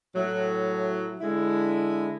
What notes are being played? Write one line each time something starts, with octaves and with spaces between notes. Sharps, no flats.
A2 F#3
D3 G#3 E4